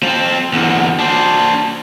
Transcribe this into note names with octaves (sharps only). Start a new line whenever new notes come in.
F3 C4
E2 D3
D4 C5